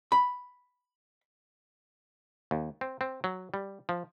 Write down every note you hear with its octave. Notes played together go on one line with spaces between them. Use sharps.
B5
D#2
C4
C4
F#3
G3
F3